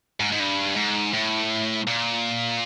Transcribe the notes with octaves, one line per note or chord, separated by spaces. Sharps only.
G#2
G#2
G2
G#2
A2
A#2